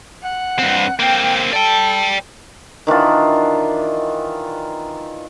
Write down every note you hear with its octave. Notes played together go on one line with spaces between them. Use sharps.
F#5
G2 C4
A#3 C4 G5
A4 D5 G5
D#3 E3 D4 F4